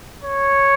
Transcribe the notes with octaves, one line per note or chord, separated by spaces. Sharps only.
C#5